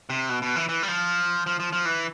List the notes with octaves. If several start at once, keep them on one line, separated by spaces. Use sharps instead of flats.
C3
B2
B2
E3
E3
G3
F3
F3
F3
F3
E3